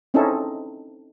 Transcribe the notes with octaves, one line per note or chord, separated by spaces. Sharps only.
C4 C#4 D#4 E4 G#4 A4